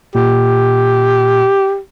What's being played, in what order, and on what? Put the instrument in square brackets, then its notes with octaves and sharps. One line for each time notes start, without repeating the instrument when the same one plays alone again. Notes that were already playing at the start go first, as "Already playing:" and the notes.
[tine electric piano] A#2 [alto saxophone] G4